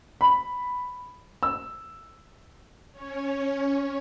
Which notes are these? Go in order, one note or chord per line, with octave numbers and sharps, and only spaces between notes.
B5
E6
C#4 C#5